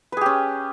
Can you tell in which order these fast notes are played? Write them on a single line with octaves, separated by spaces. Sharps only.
B4 G#4 G4 C#4